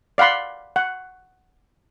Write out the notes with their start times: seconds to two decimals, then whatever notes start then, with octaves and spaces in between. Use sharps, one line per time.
0.18 D5 F5 F#5 B5 C6
0.76 F#5